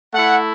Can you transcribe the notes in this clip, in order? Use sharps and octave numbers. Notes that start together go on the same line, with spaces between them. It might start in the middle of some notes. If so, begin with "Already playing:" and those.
A3 E4 F#5